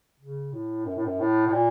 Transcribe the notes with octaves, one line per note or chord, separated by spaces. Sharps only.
C#3
A2
F#2
A2
F#2
A2
A2
A#2